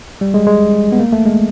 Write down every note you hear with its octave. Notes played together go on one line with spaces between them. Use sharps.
G3
G#3
G#3
B3
A#3
A3
G#3